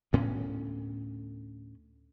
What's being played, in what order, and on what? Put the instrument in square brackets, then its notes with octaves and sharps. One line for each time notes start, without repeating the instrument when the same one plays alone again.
[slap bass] D2 A2 B3 C#4